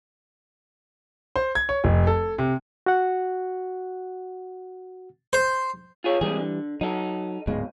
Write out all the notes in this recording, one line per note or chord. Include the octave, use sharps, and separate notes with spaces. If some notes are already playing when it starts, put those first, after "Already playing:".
C5
G#6
C#5
F1
A4
C3
F#4 F#5
C5
F4 G#4 C#5
G#2 C3 E3 G3 G#4
D3
F#3 D#4 A4
D1 C#2 G#2 B2 G#3